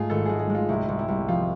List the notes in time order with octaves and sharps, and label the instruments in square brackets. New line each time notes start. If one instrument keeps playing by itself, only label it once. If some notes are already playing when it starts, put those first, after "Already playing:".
Already playing: [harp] G#2 A3 [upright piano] F4 G#4
[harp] G#1 [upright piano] A4
[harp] G#3 [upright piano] G#4
[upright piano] G#4
[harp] G#3
[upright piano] F4
[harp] C2 [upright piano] E4
[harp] C2
[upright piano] E4
[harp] C2
[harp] F3 [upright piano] F4